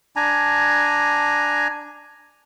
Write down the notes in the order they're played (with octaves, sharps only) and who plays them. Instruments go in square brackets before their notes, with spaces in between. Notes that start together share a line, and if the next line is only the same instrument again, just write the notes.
[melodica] D4 G#5 A#5